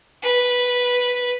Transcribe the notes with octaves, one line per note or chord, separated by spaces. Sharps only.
B4